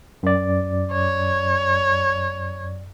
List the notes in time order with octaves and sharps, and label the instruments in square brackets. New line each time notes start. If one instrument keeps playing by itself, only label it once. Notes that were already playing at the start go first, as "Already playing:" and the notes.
[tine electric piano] F#2 D5
[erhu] C#5